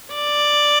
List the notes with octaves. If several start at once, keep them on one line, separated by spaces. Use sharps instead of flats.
D5